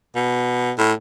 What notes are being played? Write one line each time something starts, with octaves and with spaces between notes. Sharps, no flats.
B2
A2